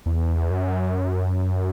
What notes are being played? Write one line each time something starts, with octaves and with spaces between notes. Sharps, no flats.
E2
F#2